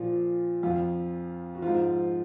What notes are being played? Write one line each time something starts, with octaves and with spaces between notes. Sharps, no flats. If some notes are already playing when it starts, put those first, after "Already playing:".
Already playing: A#2 F3 F4
F2 F3 F4
F#4
G#2 F3 F4